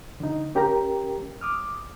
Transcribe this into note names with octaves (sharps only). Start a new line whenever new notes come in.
D3 D#4
C#4 G4 A#4 G5 A#5
D6 D#6 F6